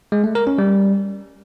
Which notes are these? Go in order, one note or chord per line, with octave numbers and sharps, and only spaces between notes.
G#3
A3
A#4
C#4
G3